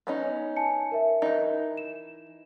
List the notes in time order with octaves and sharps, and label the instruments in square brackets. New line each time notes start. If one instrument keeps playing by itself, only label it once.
[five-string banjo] B3 C#4 D#4
[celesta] G#5 A5 C#7
A#4 E5
[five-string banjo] E3 D#4
[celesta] E7